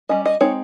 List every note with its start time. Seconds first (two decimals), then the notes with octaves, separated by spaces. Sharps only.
0.09 G3 C#4 D#5
0.26 D#5
0.41 G#3 C4 D#4 C#5